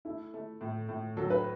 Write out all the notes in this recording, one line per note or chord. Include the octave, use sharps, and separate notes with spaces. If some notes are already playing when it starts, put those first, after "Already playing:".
A3 E4
A3
A2
A2
F#3 A4
B4